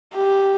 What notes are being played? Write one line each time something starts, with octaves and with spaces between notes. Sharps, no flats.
G4